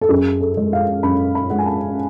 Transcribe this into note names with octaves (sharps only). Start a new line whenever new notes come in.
A4
F#2 G#4
A4
G#3
F5
F#2 B5
B5
G#3 F#5
G#5
A5